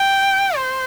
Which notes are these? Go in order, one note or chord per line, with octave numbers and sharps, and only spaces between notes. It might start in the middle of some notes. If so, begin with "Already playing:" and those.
Already playing: G5
C5